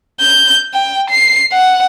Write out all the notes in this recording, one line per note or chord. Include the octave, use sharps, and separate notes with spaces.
G6
G5
C7
F#5